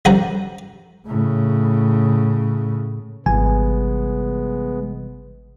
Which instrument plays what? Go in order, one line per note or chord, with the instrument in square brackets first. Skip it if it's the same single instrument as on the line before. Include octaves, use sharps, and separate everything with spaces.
[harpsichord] A1 G2 D3 F3 F#5 A#5
[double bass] A2 C#3
[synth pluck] G#1 G#5 [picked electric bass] C3 E3 G3 [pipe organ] G#3 B3